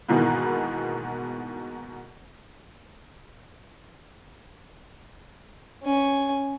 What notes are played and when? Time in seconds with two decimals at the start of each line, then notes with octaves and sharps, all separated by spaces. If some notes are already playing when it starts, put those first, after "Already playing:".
0.09 G#2 B2 D#3 E3 A#3 B3
5.83 C#4 G#5